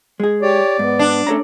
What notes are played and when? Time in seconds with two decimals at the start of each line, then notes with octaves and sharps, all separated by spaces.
0.20 G#3 G#4
0.42 G4 C#5 D5
0.79 G#2 B3
0.99 D4
1.27 A3 C#4 A4 C#5 A#5